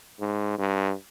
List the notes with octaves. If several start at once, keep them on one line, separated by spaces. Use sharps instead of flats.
G#2
G2